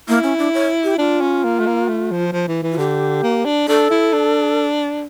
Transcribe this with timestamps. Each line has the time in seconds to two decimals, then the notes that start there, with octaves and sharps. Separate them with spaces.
0.09 A#3 E4
0.23 C#4
0.38 D4
0.54 C#5
0.84 G4
0.98 D4 F4
1.21 C#4
1.44 A#3
1.59 A3
1.66 A#3
1.88 A3
2.11 F3
2.33 F3
2.48 E3
2.63 E3
2.72 F4
2.78 D3 G4
3.23 A#3
3.45 D4
3.68 D4 A4
3.90 E4
4.13 D4